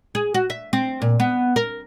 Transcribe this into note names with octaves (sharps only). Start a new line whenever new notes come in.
G#4
F#4
E5
C4
A#2
B3
A#4